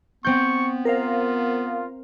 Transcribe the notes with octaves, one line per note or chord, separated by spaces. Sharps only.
B3 C4 C#6 G6
F4 A#4 C5 F5